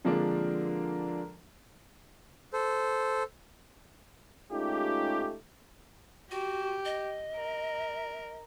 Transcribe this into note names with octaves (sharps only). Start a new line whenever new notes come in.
D3 F3 G#3 A#3 C4 D4
A4 C5
G#3 A3 C#4 D#4 F4 G4
F#4 G4
D#5
A#4